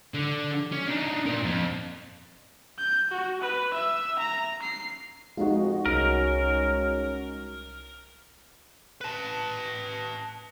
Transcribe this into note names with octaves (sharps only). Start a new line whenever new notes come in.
D3
C#4
D4 D#4
A#2 A#4
F2
G6
F#4
B4
E5
A#5
C7
F2 G#3 D#4 F4 F#4
C2 C#4 A#4
B4 A5